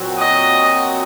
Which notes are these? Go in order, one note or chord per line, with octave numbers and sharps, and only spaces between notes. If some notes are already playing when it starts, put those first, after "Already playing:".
Already playing: A#2 F#3 C4 F#4
D#5